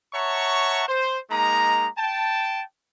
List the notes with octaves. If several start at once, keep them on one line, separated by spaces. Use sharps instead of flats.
C#5 E5 F#5 A5 A#5 C#6
C5
G#3 A#3 D#4 A#5
G5 A5